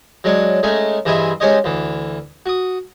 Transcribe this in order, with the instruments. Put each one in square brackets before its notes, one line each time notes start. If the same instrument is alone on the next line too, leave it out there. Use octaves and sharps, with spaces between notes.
[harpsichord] F#3 G#3 D4 C#5
G#3 A3 C#4 D#4
G2 E3 G#4 C5 D#5 E5
G#3 C#4 G4 C5 C#5 D#5
D2 E3
F#4 D#6